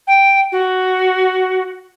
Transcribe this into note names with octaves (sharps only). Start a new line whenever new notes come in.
G5
F#4